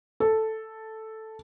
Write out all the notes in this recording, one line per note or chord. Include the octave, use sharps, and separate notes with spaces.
A4